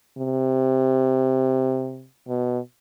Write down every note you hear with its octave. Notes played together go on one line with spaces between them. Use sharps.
C3
B2